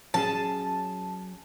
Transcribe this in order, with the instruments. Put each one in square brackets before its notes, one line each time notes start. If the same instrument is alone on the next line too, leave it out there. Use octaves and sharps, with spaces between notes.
[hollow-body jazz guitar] F#3 C#4 G#4 [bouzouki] A5